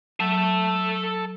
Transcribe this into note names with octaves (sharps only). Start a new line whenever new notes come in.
F#3 A4 E5